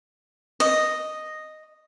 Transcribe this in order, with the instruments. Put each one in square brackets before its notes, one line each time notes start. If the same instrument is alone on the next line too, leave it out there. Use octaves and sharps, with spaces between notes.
[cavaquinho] D#5